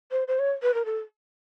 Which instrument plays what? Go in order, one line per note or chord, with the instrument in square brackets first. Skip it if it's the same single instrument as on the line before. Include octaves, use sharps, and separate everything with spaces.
[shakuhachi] C5
C5
C#5
B4
A#4
A4